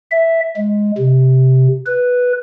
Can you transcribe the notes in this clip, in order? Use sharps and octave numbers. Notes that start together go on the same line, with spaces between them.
E5
G#3
C3
B4